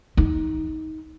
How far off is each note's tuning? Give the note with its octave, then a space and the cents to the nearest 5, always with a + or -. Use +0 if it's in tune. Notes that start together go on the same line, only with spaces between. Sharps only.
D#4 +15